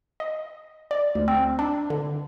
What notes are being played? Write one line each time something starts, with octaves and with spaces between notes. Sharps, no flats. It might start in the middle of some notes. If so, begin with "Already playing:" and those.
D#5
D5
D2
C4
D4
D3